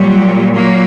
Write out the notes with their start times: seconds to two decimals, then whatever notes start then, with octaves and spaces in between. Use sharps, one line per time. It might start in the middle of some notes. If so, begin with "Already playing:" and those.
Already playing: A#2 F#3 G3
0.54 F#3 A#3